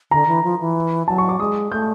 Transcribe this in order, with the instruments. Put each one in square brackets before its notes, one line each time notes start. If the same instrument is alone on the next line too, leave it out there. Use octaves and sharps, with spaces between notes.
[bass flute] D3 [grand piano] A#5
[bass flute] E3
F3
E3
[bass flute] F#3 [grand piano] A5
[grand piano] C#6
D6
[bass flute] G#3 [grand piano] D#6
[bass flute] A3 [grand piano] G6